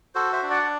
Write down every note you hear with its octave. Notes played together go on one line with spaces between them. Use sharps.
F#4 A4 C5
C5 E5
D4
D5 F#5